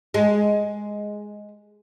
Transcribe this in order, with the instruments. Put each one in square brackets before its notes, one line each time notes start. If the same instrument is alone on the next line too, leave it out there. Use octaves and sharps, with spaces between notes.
[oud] G#3